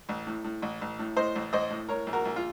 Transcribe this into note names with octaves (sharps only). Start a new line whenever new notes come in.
A1
A2
A2
A1
A1
A2
A2 C5 D#5
A1
A1 C5 D#5
A2
A2 A#4 C#5
A#1
F#4 A#4
A#1
F4